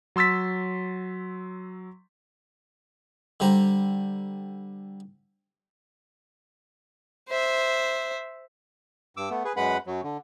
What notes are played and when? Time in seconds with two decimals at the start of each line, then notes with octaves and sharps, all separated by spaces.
0.16 F#3 C6 E6 A6 B6
3.40 D3 G3 C5 A#5
7.29 C5 E5
9.17 G2 D6 E6
9.30 A3 B3
9.45 G#4 B4
9.57 F#2 G#3 B4 F#5 B5
9.87 F#2 F#3
10.04 D3